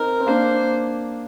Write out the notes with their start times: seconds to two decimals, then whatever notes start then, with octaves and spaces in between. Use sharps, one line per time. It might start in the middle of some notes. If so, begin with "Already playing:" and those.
Already playing: C4 D#4 A#4
0.20 C4
0.27 A#3 D4 C5